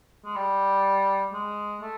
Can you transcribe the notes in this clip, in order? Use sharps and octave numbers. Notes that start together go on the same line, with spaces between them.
G#3
G3
G#3
A3